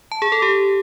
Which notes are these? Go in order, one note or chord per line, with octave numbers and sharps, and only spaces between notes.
A5
G#4
A4
G4